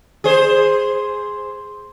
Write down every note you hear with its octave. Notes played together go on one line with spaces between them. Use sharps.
G#4 C5